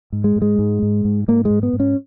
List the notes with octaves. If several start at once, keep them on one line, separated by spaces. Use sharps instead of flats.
G#2
G#3
G#2
G#3
G#2
G#2
G#2
G#2 A#3
G#3
G#2
B3
G#2
C#4